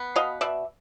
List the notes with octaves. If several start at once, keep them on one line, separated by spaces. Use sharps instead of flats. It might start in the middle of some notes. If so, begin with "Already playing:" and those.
Already playing: B3
B2 D#5 F5
B2 D5 E5